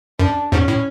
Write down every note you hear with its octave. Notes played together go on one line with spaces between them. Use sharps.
F#2 D4
E2 G#2 C#4
A2